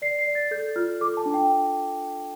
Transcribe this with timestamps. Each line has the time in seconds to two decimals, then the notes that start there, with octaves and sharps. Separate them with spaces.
0.02 D5 C7
0.19 C7
0.27 D5
0.35 A6
0.51 A4 G6
0.76 F4 F6
1.01 A4 D6
1.17 A5
1.26 D4
1.34 G5